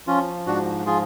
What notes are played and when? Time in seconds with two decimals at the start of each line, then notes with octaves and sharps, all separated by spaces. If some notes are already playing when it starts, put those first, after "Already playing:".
0.07 F3 C#4 F4
0.47 G#2 D4 F#4
0.86 F3 F4 G#4